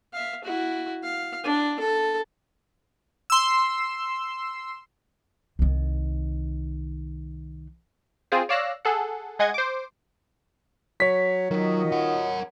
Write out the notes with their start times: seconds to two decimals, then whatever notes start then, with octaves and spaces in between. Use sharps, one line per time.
0.13 E5 F5
0.44 E4 F#4
1.03 F5
1.44 D4
1.80 A4
3.30 C6 E6
5.59 C2 D#3
8.32 C4 F4 G#4 C5
8.49 C#5 D5 F5 E6 F#6 A#6
8.85 G#4 A4 F#5
9.39 G#3 G#4 D#5 F#5 G#6
9.54 C5 D6
11.00 F#3 C#5 B6
11.51 D#3 F#3 F4 F#4 D#5
11.92 A#4 F#5